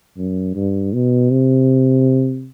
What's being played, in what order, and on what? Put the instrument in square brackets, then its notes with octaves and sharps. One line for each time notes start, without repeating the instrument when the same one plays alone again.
[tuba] F#2
G2
B2
C3